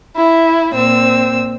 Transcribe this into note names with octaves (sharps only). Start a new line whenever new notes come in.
E4
A#2 C4 E6